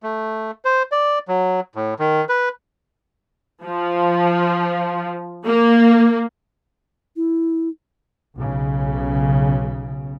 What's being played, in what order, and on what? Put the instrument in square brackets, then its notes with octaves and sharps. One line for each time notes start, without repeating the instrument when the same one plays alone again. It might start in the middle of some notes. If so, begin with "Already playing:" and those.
[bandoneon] A3
C5
D5
F#3
A2
D#3
B4
[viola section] F3
A#3
[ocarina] E4
[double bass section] B1 C#3